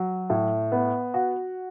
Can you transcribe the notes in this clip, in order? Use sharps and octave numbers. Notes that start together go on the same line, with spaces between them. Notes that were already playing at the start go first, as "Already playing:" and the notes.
Already playing: F#3
A2
B3
F#4